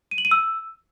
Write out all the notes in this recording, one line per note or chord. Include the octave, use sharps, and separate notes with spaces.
D#7
F#7
D#7
E6